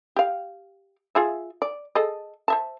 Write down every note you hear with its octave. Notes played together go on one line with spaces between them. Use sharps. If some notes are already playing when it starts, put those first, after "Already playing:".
G4 F5
F4 G#4 E5
D5
G#4 A4 D#5
C5 E5 A5